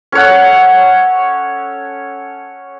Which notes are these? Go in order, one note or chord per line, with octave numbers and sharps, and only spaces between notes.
C#4 A4 C#5 F#5